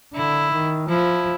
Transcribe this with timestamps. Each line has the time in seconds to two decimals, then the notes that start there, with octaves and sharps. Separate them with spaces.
0.14 D3 E4
0.51 D#3
0.88 F3 E4